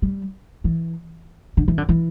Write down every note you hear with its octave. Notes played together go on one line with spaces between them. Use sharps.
G3
E3
D3
E3
D3
E3